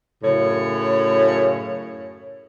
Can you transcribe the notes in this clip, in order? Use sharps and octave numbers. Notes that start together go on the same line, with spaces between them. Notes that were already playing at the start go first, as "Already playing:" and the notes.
F#2 A2 C#3 C#5